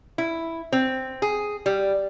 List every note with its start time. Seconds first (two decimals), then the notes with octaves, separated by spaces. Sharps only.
0.18 E4
0.72 C4
1.22 G#4
1.66 G3